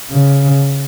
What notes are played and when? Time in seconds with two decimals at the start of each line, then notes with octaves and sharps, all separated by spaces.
0.11 C#3